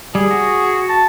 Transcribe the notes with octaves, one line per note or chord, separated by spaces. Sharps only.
G3 G#4
F#4
A5